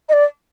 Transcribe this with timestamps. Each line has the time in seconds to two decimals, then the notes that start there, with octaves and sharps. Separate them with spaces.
0.09 D#5
0.13 D5